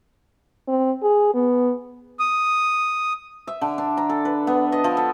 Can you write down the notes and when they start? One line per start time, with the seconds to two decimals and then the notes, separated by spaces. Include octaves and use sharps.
0.68 C4
1.03 G#4
1.34 B3
2.19 D#6
3.47 E5
3.61 D3
3.78 D4
3.97 A#5
4.09 A4
4.25 B4
4.47 B3
4.72 D#5
4.84 F3
4.97 A4